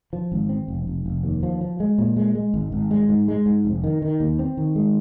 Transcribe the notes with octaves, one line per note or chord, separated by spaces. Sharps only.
F3
G#1
C4
F1
F1
F1
D#2
F3
F3
G#3
A#2
G#3
G#3
G#1
G#1
G#3
G#2
G#3
G#2
F1
D#3
D#3
D#2
C4
D#3
G#3